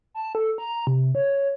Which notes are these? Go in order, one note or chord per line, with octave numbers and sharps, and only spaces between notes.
A5
A4
A#5
C3
C#5